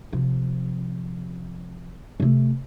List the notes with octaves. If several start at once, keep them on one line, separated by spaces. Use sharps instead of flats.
C3 F3
C3 A3